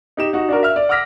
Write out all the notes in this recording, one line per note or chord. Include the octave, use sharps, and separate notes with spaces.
D#4 G4 E7
D#4 F#4
D4 F#4 A#4
E5 F6
D5
F#5 D6 E6 F6 A#6 B6